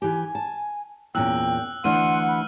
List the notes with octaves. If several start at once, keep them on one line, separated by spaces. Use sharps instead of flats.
E3 G4 G#5
A5
E2 A#2 C#4 G5 E6 F#6 F#7
D2 E3 D4 F#5 C6 F6 D#7
B5